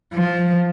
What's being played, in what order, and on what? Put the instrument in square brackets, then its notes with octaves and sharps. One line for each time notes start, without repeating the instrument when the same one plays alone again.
[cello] F3